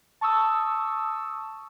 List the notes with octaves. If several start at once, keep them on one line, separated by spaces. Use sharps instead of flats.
A5 C#6 D#6 E6